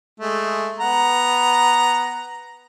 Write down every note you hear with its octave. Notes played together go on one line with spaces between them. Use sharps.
G#3 A3
B3 F#5 A#5